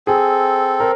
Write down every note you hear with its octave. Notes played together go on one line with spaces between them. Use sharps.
C4 G#4 A4
A#4 C5